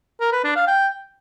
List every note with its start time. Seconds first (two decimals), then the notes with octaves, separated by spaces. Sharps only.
0.20 A#4
0.32 B4
0.44 D4
0.56 F5
0.67 G5